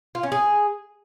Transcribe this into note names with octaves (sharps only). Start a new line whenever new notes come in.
F4
C#4
G#4